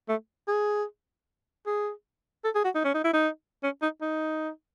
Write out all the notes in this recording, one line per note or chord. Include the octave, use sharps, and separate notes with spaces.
A3
G#4
G#4
A4
G#4
F#4
D#4
C#4
D#4
E4
D#4
C#4
D#4
D#4